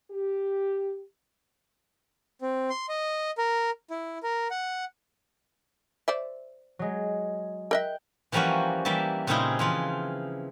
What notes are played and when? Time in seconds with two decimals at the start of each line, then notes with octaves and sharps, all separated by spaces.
0.11 G4
2.42 C4
2.70 C6
2.89 D#5
3.38 A#4
3.90 E4
4.23 A#4
4.51 F#5
6.08 C5 D5 E5
6.79 F#3 G#3
7.71 A#4 D#5 E5 G5 F#6 G6
8.32 E3 F3 G3 A#3 C#4 F#4
8.85 E3 G3 A#3 E5 A5
9.27 A#2 C#3 C4 D#4 E4 G#4
9.59 E3 F3 F4